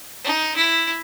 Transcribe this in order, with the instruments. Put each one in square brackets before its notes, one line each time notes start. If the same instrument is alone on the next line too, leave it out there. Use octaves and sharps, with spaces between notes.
[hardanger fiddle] D#4
E4